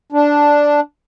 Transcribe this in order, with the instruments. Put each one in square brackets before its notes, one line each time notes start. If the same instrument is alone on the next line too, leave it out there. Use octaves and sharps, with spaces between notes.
[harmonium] D4